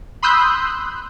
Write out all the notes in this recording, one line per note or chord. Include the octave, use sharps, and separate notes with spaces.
B5 C6 D#6 E6 F#6 G6